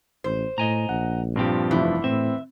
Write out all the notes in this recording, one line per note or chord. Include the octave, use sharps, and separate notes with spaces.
A1 C5
A2 D#5 G#5 A#5
A#1 F#5
G2 A#2 F3 C4 G4
F1 E2 E3
A2 C4 E5